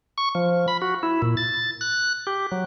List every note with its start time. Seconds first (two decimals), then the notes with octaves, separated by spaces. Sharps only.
0.18 C#6
0.35 F3
0.68 B5
0.82 F#4
1.03 E4
1.22 A#2
1.37 A6
1.81 F#6
2.27 G4
2.52 F#3